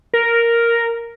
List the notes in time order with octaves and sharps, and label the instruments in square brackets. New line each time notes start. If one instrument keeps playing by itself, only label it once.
[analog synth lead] A#4